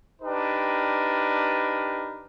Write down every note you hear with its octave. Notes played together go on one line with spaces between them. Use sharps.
D4 D#4 G4 A#4 B4